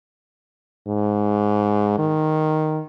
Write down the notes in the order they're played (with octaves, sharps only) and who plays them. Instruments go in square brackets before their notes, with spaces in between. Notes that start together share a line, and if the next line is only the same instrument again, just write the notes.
[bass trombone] G#2
D#3